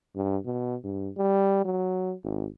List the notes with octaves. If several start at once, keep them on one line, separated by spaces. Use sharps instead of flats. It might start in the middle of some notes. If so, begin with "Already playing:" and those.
G2
B2
G2
G3
F#3
G#1